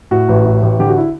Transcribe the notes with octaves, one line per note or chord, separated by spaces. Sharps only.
A2 F#4
A1
A2
A1
D3 G4
F#4
E4